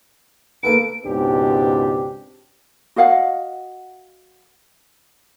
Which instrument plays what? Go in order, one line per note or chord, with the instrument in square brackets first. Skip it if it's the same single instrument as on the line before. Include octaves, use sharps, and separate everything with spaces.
[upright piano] A#3 A4 B4 [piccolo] D7
[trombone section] C#2 G#2 B2 C4 D4 G4
[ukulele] F#4 D#5 F5 F#5